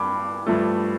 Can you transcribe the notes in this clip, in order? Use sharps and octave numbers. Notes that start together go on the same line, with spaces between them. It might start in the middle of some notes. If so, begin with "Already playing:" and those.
Already playing: G2 B5 D6
G2 F3 A3